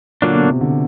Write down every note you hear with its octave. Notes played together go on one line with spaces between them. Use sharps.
A#2 D3 F#3 A#3 D4
B2
C3
D3